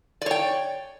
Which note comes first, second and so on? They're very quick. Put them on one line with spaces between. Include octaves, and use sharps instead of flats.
D5 C#5 G5